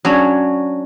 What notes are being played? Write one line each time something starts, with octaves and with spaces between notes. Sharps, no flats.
F#3 C#4 D4 F#4 C#5